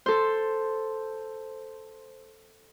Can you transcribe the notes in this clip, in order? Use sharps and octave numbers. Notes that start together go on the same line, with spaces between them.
A4 C5